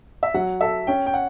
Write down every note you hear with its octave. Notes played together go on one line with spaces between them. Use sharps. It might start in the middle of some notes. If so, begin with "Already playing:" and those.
E5
F#3 F#5
A4 E5
C#4 G5
G5
F#5